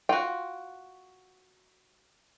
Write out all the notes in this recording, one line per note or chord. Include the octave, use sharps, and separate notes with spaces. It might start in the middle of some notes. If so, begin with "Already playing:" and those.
F4 F#4 G5